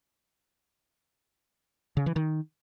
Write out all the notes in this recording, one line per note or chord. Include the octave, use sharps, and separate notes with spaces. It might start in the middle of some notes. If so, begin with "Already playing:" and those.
C#3
E3
D#3